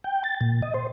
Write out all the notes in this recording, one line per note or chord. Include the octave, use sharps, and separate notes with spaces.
G5
A6
A#2
D#5
C5